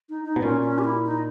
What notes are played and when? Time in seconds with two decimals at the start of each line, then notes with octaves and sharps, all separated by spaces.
0.10 D#4
0.25 D#4
0.36 B2
0.42 A#2 C#4
0.64 C#4
0.79 G4
0.85 E4
1.06 D#4